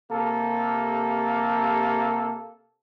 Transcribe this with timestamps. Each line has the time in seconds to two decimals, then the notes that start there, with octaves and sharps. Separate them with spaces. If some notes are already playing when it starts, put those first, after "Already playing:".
0.11 C3 A#3 G4 A4